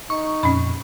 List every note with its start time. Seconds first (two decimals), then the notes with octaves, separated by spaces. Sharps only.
0.10 D#4 C#6
0.43 F2 A#2 C#4 B5